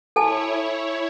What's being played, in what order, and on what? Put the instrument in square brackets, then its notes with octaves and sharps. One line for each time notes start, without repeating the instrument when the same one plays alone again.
[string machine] E4 C#5 [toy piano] A4 G#5 A5